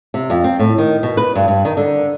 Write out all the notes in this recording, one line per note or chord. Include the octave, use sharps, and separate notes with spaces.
C3
F2
C4
A2
D#3
B2
B4
G2
G2
D#3
D3